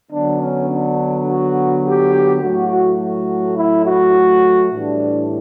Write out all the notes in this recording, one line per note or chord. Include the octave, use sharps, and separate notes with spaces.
D3 F#3 B3 D4
C#4
D4
F#4
G4
A2 F#3 A3 F#4
F#4
E4
F#4
A2 E3 G3 D4